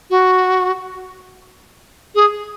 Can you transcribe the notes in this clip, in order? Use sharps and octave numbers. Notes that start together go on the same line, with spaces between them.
F#4
G#4